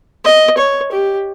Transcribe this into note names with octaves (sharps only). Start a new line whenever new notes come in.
D#5
C#5
G4